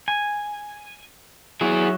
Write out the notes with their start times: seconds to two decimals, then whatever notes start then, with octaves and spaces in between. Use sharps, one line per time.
0.08 G#5
1.61 F#3 E4 G#4